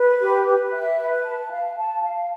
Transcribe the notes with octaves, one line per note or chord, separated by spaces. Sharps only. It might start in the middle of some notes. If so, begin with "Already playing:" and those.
Already playing: B4
G4
B4
E5
B4
A5
F5
A5
F5